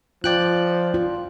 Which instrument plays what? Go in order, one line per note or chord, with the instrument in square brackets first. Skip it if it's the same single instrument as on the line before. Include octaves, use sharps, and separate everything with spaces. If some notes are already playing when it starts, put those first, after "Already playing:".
[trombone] F3 [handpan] F4 [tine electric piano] D5 G5 F#6
[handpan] F4